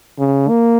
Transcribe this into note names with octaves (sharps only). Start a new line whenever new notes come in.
C#3
A#3